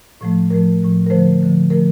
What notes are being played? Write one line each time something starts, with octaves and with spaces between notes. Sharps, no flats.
A2 F3 A3
A2 F3 A3 A#4
A2 F3 A3
A#4
D3 F3 A3 C5
D3 F3 A3
D3 F3 A3 A#4